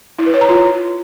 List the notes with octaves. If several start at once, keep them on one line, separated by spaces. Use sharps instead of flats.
E4
B4
C#5
A#5
F4